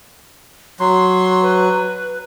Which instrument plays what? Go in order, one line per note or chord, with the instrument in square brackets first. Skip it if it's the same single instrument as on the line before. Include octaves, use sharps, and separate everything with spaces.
[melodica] F#3 [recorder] C6
[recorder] B4